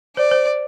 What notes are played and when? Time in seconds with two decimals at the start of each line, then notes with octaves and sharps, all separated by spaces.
0.17 C5 D5
0.31 C5